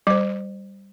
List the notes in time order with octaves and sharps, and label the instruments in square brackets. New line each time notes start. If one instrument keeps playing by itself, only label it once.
[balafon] G3 C5